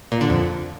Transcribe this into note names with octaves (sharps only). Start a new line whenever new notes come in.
A#2
D3
F2